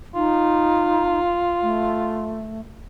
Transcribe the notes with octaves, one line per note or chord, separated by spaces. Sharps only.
D#4 F4
A3